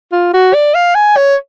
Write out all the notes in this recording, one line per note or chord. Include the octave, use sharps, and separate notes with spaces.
F4
F#4
D5
F5
G#5
C#5